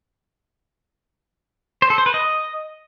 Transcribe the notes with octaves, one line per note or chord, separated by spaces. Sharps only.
C5
A4
C5
B4
D#5